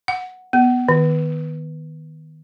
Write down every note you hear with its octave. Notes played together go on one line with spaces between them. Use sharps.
F#5
B3
D#3